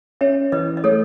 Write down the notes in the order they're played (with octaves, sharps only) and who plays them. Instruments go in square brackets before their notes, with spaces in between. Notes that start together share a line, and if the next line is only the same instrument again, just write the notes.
[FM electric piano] C#4 [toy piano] C#5 E5
[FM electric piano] E3 [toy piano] B4 D#5
[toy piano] D#5
[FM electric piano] A3 [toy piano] A4 C#5